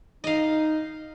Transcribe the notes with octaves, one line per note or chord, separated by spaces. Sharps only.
D#4 D#5 F5